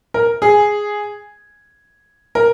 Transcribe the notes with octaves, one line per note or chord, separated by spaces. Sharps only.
A#4
G#4
A#4